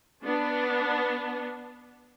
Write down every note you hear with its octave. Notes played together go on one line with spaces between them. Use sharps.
B3 D4